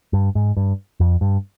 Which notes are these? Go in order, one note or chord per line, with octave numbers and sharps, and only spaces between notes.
G2
G#2
G2
F2
G2